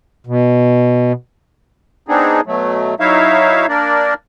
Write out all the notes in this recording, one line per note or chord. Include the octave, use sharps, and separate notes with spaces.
B2
B3 C4 D4 D#4 G#4
B2 F#3 A3
F#3 D#4 E4 C#5 E5 F5
A#3 D4 A#4 D5